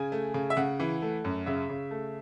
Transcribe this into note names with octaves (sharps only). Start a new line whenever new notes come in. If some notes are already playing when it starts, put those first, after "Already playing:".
Already playing: C#3 G#5
A3
C#3
E5
C#3 F#5
E3
A3
F#2
C#3 E5
C#3
A3